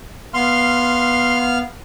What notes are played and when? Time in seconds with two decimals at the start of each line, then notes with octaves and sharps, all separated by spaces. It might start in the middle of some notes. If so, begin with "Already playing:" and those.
0.34 B3 F5 C6 F6